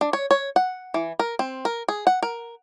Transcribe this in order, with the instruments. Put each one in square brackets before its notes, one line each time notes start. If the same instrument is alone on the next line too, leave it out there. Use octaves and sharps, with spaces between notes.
[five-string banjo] D4
C#5
C#5
F#5
E3
A#4
C4
A#4
G#4
F#5
A#4